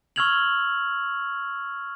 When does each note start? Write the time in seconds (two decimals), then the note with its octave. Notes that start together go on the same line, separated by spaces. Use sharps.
0.16 C#6 E6 F6 G#6 F7 F#7